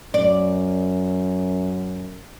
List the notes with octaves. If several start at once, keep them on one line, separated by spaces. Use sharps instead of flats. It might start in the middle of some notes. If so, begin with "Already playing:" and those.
F#2 D5